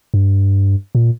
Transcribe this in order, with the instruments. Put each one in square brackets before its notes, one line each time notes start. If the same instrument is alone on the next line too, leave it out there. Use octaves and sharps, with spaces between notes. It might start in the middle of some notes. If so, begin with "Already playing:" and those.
[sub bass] G2
A#2